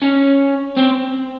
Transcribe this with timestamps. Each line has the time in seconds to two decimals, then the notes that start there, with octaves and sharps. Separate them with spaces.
0.02 C#4
0.77 C4